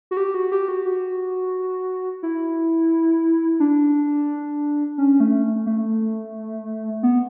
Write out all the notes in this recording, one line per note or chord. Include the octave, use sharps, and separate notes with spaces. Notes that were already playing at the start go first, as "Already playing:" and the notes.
F#4
G4
F#4
G4
F#4
F#4
E4
D4
C#4
A3
A3
B3